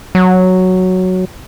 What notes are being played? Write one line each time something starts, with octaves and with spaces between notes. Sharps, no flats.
F#3